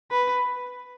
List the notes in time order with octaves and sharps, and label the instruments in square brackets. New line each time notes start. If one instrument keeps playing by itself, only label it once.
[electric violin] B4